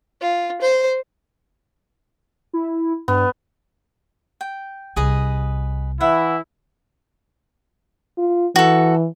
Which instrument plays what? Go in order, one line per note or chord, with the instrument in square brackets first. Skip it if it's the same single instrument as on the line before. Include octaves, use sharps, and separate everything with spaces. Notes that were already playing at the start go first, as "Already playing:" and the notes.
[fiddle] F4
C5
[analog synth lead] E4
[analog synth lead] G2 [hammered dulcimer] B3
[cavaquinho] G5
[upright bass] C2 [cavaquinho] G#4 B4 D#5
[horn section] E3 E4 [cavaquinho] E5 F#5
[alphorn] F4
[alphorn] E3 [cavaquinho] F#4 A4